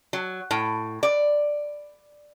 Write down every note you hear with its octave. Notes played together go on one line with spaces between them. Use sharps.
F#3
A2
D5